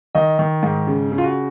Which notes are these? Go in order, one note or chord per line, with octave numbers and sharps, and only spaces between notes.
D#3 D#5
D#3
G#2
C#3
C#3
F4
F#4